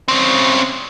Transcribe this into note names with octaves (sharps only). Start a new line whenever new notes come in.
C#3 C4